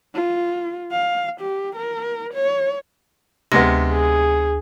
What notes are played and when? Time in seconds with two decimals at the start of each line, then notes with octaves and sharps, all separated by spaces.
0.15 F4
0.92 F5
1.41 G4
1.76 A#4
2.33 C#5
3.52 D2 C3 G#3 B3 A#6
3.93 G#4